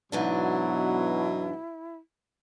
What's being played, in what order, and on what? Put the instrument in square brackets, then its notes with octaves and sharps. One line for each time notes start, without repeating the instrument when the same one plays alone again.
[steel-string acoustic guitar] G#2 E3 D4 [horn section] B2 [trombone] F#3 [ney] E4